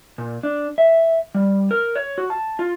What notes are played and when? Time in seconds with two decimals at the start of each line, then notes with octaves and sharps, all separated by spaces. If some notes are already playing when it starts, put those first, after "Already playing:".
0.18 A#2
0.43 D4
0.78 E5
1.35 G3
1.71 A#4
1.95 C#5
2.18 F#4
2.30 A5
2.59 F4